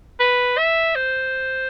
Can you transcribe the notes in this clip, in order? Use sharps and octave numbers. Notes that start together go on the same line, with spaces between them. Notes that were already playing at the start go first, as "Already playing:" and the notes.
B4
E5
C5